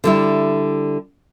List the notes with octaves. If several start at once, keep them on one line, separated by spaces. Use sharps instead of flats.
D3 G3 E4